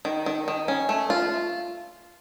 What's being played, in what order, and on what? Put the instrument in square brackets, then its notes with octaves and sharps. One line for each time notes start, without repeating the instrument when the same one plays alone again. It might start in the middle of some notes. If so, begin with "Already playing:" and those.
[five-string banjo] D#3
D#3
D#3
C#4
A3
F4